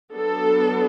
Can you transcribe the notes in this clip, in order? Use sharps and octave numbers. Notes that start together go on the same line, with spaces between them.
F#3 B3 D4 A4